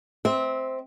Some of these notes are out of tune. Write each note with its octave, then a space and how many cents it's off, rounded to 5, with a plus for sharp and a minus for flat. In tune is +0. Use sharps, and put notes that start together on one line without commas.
C4 +0 E5 -30